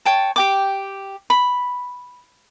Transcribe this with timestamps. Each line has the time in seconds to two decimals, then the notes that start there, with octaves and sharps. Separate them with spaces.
0.05 C#5 G5 A5
0.36 G4 G5 D6
1.30 B5